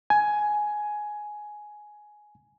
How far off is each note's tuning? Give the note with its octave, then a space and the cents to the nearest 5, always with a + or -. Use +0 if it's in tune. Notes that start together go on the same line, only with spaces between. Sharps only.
G#5 +10